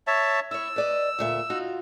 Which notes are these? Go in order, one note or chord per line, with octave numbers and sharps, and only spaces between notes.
C#5 E5 A5
E4 C#5 E6
B4 D5 D#5
D2 A#2 E5
D#4 F4 F#4